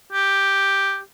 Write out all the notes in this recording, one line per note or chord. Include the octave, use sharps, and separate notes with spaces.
G4